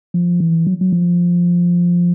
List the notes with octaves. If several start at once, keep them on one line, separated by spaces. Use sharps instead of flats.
F3
E3
F#3
F#3
F3